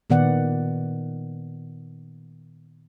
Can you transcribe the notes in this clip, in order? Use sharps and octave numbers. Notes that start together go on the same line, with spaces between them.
A#2 D#3 B3 D5 F#5